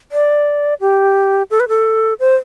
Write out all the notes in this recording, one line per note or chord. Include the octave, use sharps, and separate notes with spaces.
D5
G4
A4
B4
A4
C5